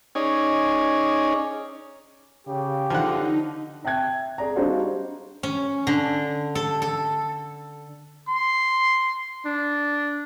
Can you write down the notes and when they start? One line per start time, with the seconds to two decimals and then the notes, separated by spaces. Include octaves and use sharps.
0.15 C#4 D#4 G#4 C#5 D5
2.47 C#3 G4
2.90 D3 F3 D#4 F#5
3.84 E5 G5 A5 F#6 G#6
4.38 G#4 D5 A#5
4.56 G3 D4 D#4 F#4 C5 F5
5.43 C#4
5.87 D3
6.55 A4
6.82 A4
8.28 C6
9.46 D4